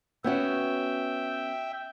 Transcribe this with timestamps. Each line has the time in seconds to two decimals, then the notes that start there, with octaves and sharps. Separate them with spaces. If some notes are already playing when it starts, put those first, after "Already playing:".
0.24 B3 C#4 F#4 E5 G5